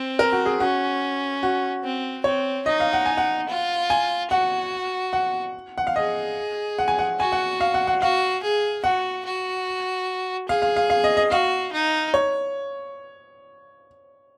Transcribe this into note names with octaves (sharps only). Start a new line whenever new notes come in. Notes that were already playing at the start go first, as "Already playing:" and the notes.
Already playing: C4 C5
A#4
F#4
G#4
C#4 F#4
F#4
C4
C4 C#5
D#4 D#5
F5
F#5
G#5
F#5
F4
G#5
F#4 F#5
F#5
F#5
F5
G#4 D#5
F#5
G#5
F#5
F#4 G#5
F#5
F5
F#5
F#5
F#4 F5
G#4
F#4 F#5
F#4
G#4 F5
F5
F5
F5
D#5
D#5
F#4 F5
D#4
C#5